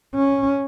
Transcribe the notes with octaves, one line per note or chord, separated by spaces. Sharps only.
C#4